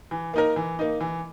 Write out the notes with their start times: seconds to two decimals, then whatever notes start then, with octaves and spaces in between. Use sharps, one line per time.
0.11 E3
0.34 A#3 D#4 A#4
0.56 E3
0.79 A#3 D#4
1.01 E3